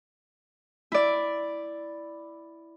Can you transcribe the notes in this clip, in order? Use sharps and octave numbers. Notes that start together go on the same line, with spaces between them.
E4 D5